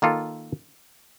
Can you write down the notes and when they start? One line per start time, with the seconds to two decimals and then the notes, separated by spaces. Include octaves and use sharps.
0.02 D#3 A#3 F4 A4